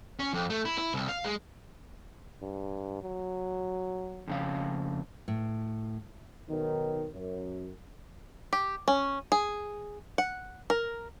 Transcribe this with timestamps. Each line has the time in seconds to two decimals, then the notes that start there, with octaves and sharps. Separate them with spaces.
0.19 C#4
0.34 F2
0.50 A3
0.65 E4
0.78 E4
0.94 C2
1.08 F5
1.25 G#3
2.42 G2
3.03 F#3
4.28 F2 C#3 F5
5.28 A2
6.49 B1 D#3
7.13 F#2
8.53 G4
8.88 C#4
9.32 G#4
10.18 F#5
10.70 A#4